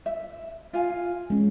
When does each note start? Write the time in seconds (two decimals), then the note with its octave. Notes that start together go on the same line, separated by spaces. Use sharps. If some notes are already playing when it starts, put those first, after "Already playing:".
0.06 E5
0.73 F4 F5 G#5
1.30 G#3 C#4